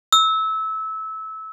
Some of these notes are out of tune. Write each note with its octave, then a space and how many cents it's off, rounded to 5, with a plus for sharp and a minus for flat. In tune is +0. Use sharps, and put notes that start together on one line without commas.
E6 -20